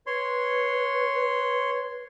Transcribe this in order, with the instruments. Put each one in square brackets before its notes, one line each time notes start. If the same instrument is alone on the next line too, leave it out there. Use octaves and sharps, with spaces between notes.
[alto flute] B4 [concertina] C#5 C6